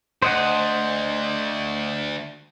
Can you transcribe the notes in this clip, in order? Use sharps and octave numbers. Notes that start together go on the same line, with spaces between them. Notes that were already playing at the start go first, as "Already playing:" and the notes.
D2 C5 D#5 F#5